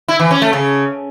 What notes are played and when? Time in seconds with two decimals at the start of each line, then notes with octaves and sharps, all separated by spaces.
0.08 E4
0.20 E3
0.31 C#4
0.42 A3
0.53 C#3